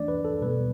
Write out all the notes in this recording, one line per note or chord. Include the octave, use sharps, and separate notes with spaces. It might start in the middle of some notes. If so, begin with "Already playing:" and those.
Already playing: E3 A3 D4 D5
B4
A4
B2 G3 B3 B4